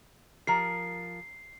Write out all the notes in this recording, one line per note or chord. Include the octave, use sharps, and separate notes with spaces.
F3 G4 A#4 A#5 C7